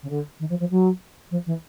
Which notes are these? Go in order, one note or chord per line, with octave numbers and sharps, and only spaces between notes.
C#3
D3
D#3
F3
F3
F#3
F3
E3